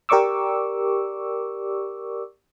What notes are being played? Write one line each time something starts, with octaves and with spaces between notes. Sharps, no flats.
G4 A#4 D5 C#6 D6 E6